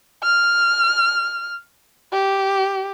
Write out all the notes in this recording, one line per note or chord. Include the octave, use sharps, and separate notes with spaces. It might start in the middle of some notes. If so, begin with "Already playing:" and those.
F6
G4